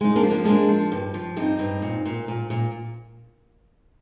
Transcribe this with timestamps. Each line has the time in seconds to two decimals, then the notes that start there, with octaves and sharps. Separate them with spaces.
0.01 G#3 D#4
0.15 A#3 D4
0.23 F3
0.30 A#3 D4
0.45 G#3 A#3 D4
0.69 F3
0.92 G2
1.14 F3
1.36 G2 C4 D#4
1.59 G2
1.82 A#2
2.05 A#2
2.28 A#2
2.50 A#2